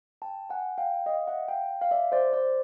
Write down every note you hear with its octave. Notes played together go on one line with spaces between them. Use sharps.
G5 A5
F#5 G#5
F5 G5
D#5 F5
E5 F#5
F5 G5
F5
D5 E5
C5 D5
C5 D5